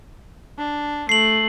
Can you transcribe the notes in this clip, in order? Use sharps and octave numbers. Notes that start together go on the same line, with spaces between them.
D4
A3 C7 F#7